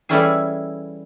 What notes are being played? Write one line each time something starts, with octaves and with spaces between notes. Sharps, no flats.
E3 G3 A3 C#4 E4 G#4